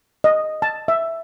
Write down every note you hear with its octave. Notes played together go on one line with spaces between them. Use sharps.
D#5
A5
E5